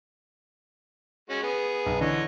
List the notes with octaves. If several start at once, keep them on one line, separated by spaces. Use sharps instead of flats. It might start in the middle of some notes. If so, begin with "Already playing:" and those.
G#3 C#4 F#4
B3 G#4
B1
D3 E3 C#5 D#5